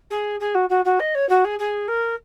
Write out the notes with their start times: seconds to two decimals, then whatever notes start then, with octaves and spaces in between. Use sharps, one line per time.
0.10 G#4
0.40 G#4
0.54 F#4
0.69 F#4
0.85 F#4
0.99 D#5
1.15 C#5
1.29 F#4
1.44 G#4
1.59 G#4
1.88 A#4